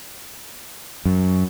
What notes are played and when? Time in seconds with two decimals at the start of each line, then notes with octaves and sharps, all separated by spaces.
1.05 F#2